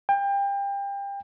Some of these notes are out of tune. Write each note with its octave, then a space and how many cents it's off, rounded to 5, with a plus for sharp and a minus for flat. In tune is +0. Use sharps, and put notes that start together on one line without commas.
G5 +30